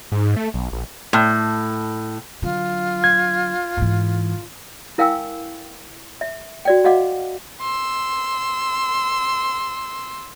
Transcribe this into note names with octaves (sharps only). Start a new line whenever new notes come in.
G#2
A3
B1
A#1
A2
D3 F#3 F4
G#6
G#2 E3
E4 A#4 F5 G5 G#5 E6
E5
F#4 D5 G5
F#4 D#5 F5 F#5 D6
C6 E6